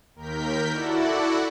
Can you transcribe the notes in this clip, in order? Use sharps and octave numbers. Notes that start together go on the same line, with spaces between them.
D#2 A#4 G6 B6
E4 F#4 A4 D5 F#5